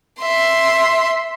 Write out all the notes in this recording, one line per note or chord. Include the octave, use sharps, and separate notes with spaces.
E5 C6